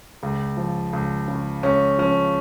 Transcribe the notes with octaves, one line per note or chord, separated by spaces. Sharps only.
C#2
F3
C#2
C#3
C#2 C#4
F3 C#4